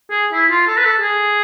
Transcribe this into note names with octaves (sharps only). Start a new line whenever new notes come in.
G#4
E4
F4
A4
B4
A4
G#4